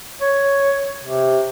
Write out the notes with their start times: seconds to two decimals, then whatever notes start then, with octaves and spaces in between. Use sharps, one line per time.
0.21 C#5
1.03 C3